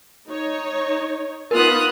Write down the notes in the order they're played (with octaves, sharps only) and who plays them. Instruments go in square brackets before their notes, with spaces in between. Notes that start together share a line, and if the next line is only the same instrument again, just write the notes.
[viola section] D#4 C#5
[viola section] B3 D#4 F4 [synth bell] A#4 [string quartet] F5 D#6 F#6